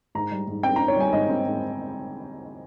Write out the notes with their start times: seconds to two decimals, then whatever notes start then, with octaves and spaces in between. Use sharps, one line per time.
0.15 G#2 A#5
0.31 G3
0.47 G#2
0.63 C4 G5
0.76 A#5
0.80 C4
0.88 C#5
0.96 G3 G#5
1.12 G#2 D#5
1.29 C4
1.45 G#2